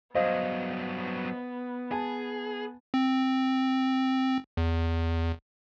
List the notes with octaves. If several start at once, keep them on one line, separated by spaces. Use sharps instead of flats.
G2 F#3 B3 C5 D#5 F5
G#4 G#5 A5
C4
E2